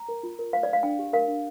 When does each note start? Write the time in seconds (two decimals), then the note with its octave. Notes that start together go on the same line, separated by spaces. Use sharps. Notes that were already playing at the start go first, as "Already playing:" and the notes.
Already playing: A#5
0.09 A#4
0.23 F4
0.39 A#4
0.53 C5 F5
0.63 D5
0.69 C5 F5
0.83 D4 G5
0.99 G4
1.13 A#4 F5
1.28 D4